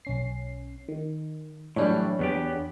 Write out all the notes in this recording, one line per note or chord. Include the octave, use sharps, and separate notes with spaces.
B1 C#4 C7
D#3
A2 E3 F#3 G3 D4 C#5
E2 B3 G4